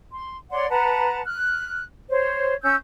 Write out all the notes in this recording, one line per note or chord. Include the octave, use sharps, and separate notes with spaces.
C6
C#5 D5 F#5 C6
B4 F#5 A5 A#5
F6 F#6
C5 C#5
C#4 E6 G6